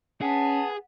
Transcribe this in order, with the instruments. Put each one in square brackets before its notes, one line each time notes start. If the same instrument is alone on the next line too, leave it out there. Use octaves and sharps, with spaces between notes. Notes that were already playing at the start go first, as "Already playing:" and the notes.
[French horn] C#4 [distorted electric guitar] G#4 [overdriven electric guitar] B4 F#5 [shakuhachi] A5